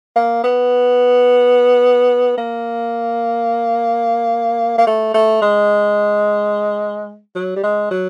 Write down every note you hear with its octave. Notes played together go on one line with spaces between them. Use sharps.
A#3
B3
A#3
A#3
A3
A3
G#3
F#3
G3
G#3
F#3